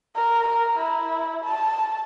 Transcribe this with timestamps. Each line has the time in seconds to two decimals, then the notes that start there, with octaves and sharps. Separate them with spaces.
0.16 A#4
0.48 A#4
0.78 E4
1.44 A5